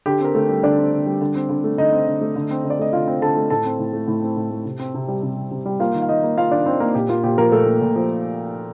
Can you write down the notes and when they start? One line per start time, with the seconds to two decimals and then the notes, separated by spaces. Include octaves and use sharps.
0.06 D3 G4
0.20 C4 A#4
0.34 D3 A3 A4
0.49 G3
0.63 D3 D4 D5
0.78 C4
0.92 D3
1.06 G3
1.21 D3
1.35 C4
1.49 D3
1.64 A3
1.78 D3 D#4 D#5
1.92 C4
2.07 D3
2.21 A3
2.36 D3
2.51 C4
2.64 D3
2.70 D5
2.79 A3 D#5
2.93 D3 F4 F5
3.07 C4
3.22 D3 A4 A5
3.36 A3
3.50 A2 A4 A5
3.65 C4
3.79 A2
3.93 A3
4.08 A2
4.22 C4
4.37 A2
4.51 A3
4.65 C3
4.79 C4
4.94 C3
5.08 G3
5.23 C3
5.37 C4
5.51 C3
5.65 G3
5.80 A#3 F4 F5
5.94 D#3
6.02 F5
6.09 D#3 D#4 D#5
6.23 A#3
6.37 A#3 F4 F5
6.51 D#3 D4 D5
6.66 D#3 C4 C5
6.80 A#3 A#4
6.95 A#2 G4
7.09 A#3 F4
7.23 A#2 G4
7.38 F3 A#3 A#4
7.52 A#2 A3 A4
7.67 A#3
7.81 A#2
7.95 F3